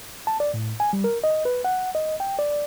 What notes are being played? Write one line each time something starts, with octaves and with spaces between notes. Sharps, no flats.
A5
D5
A2
G#5
G3
A#4
D#5
B4
F#5
D#5
G5
D5